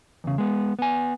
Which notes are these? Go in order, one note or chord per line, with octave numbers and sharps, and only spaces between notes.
E2 C#3
G#3 B3
B3 G#5